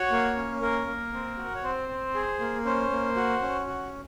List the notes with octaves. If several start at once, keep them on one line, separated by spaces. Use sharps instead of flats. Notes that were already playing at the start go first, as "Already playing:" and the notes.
Already playing: F#4 C#5
A#3
C#4
A#3 A#4
A#3
C4
F#4
C#5
C4 C5
C4
G#4
A#3
C#4 C5
A#3
F#4
C#4
F#4